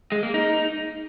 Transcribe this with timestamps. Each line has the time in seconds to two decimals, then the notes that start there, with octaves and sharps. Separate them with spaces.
0.12 G#3
0.23 A#3
0.34 D#4